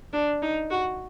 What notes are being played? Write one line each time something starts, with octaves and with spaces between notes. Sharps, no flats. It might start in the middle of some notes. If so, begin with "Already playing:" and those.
D4
D#4
F#4